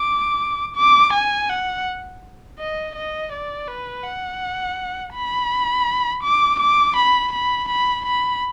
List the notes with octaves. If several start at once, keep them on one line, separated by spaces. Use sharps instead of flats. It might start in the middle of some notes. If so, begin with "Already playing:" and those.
Already playing: D6
D6
G#5
F#5
D#5
D#5
D5
B4
F#5
B5
D6
D6
B5
B5
B5
B5